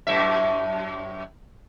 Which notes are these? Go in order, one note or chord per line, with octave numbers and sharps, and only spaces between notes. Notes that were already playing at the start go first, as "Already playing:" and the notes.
F#2 A2 E5